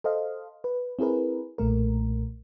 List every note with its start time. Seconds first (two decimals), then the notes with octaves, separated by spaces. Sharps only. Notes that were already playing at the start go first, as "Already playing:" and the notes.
0.04 A4 C5 D#5 F5
0.64 B4
0.99 C4 E4 G#4 A#4 B4
1.58 B1 A#2 A3 A#4